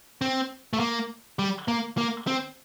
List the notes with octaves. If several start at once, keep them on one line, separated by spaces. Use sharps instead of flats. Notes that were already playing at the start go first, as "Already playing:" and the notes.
C4
A3
A#3
G3
A#3
A#3
C4